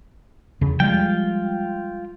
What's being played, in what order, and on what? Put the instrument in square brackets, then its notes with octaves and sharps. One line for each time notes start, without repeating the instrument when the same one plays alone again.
[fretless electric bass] E2 C#3
[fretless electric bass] F3 G3 G#3 [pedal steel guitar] F4 G5